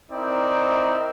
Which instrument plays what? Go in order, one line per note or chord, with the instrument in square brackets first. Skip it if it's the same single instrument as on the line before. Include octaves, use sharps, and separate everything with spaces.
[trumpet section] C4 D#4 E4 A#4 D5